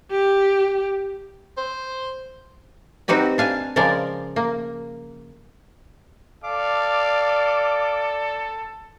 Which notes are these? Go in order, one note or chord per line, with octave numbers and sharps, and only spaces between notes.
G4
C5
C4 D#4 F#4 G4 B4
D4 F5 G#5
C#3 F3 G#3 A#4 D5 F5
A#3
A4 D5 F5 D6